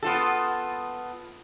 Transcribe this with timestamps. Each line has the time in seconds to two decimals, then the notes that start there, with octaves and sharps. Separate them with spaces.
0.03 B3 F4 A4